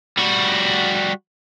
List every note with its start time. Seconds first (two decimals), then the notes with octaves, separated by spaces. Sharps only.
0.17 G3 F#4